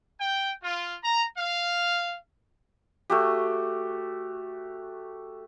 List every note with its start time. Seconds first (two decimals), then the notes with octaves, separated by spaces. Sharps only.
0.19 G5
0.62 F4
1.03 A#5
1.37 F5
3.10 A3 F#4 G4